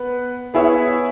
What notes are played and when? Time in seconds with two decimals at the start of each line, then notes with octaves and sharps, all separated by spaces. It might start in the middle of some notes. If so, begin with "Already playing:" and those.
Already playing: B3 B4
0.54 B3 E4 G#4 C#5 E5